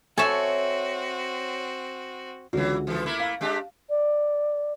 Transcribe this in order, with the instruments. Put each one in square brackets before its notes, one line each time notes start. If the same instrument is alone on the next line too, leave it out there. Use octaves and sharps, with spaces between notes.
[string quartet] C4 F#4 [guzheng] A4 E5 [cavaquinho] C#5 G#5
[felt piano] C#2 D3 F#4 [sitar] E3 F#3
[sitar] E3 F3 A4
A3 A#3 E4
[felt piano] F5
[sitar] G#3 D4 G4
[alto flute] D5